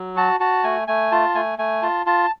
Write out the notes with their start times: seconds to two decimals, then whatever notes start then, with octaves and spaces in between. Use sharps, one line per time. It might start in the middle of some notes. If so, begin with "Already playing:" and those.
Already playing: F#3
0.16 F#4 A5
0.40 F#4 A5
0.64 A3 G#5
0.88 A3 G#5
1.12 F4 A5
1.35 A3 G#5
1.59 A3 G#5
1.82 F4 A5
2.06 F4 A5